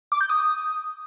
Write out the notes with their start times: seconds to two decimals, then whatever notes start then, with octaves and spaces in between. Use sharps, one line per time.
0.12 D6
0.21 G6
0.29 D#6